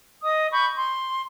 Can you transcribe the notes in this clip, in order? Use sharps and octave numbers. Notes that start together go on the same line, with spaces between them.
D#5 D#6
B5 C#6 G6
C6